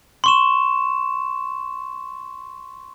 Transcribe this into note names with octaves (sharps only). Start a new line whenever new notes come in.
C6 C#6 E7